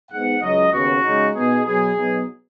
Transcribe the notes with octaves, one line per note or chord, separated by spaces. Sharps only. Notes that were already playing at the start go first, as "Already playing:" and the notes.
G#2 G#3 B3 D#4 F#5
C#2 C#3 F#3 D#5
D#2 C#3 B3 F#4
C#3 G#3 D#4
B2 B3 D#4 G#4
B2 F#3 B3 G#4
B2 F#3 B3 D#4